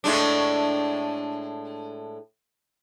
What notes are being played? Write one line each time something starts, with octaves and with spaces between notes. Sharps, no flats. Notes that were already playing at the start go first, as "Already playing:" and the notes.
A2 G#3 D4